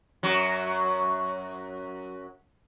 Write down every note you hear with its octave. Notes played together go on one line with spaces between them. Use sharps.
F#2 F#3